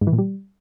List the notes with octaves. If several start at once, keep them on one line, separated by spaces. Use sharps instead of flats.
G#2
E3
A#2
G3